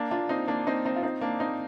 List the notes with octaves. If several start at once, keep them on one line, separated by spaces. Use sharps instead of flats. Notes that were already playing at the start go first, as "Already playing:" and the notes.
Already playing: A#3 D4
D4 F4
C4 D#4
A#3 D4
C4 D#4
C4 D#4
F4
C4 D#4
A#3 D4
C4 D#4